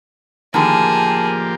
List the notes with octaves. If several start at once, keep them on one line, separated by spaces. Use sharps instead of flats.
A2 D3 D#3 F3 A#3 G4 G#4 A5